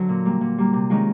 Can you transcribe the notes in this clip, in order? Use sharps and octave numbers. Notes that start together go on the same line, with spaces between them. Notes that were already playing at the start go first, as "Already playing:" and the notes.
Already playing: D3 F#3 C5
A#2
G3 A#3
A#2
G3 A#3
C3
D#3 G#3 C#4 F4